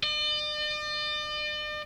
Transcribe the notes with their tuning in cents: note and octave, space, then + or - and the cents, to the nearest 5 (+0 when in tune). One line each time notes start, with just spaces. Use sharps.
D5 +45